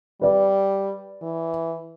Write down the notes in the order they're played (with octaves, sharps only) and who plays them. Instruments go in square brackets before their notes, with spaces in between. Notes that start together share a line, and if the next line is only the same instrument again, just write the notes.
[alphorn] G3 [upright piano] B4 D5
[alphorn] E3